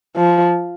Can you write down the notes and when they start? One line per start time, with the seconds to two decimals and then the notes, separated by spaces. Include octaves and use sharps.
0.16 F3